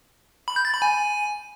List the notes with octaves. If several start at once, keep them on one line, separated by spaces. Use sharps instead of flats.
B5
G6
A6
B5
G#5